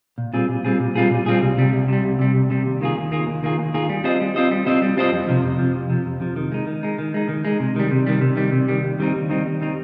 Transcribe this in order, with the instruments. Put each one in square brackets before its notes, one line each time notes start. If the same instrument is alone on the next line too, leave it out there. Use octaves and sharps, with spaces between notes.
[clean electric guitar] A#2
G3 C4 F4 G#4
A#2
G3 C4 F4 G#4
A#2
G3 C4 F4 G#4
A#2
G3 C4 F4 G#4
C2
C3 G3
C2
C3 G3
C2
C3 G3
C2
C3 G3
D#2
D#3 A#3 F4 G#4
D#2
D#3 A#3 F4 G#4
D#2
D#3 A#3 F4 G#4
D#2
D#3 A#3 F4 G#4
G3
C4 F4 C5 D#5
G3
C4 F4 C5 D#5
G3
C4 F4 C5 D#5
G3
C4 F4 C5 D#5
F2
C3 F3
F2
C3 F3
F2
C3 F3
F2
C3 F3
D#3
G#3 D#4
D#3
G#3 D#4
D#3
G#3 D#4
D#3
G#3 D#4
C3
D#3 G3
C3
D#3 G3
C3
D#3 G3
C3
D#3 G3
D#2
D#3 G3 C4 D#4
D#2
D#3 G3 C4 D#4
D#2
D#3 G3 C4 D#4